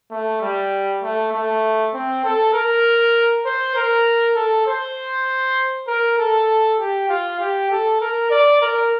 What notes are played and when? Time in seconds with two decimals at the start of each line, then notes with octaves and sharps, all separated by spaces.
0.11 A3
0.42 G3
1.03 A3
1.32 A3
1.94 C4
2.24 A4
2.54 A#4
3.46 C5
3.76 A#4
4.36 A4
4.67 C5
5.87 A#4
6.19 A4
6.80 G4
7.09 F4
7.40 G4
7.71 A4
8.01 A#4
8.31 D5
8.62 A#4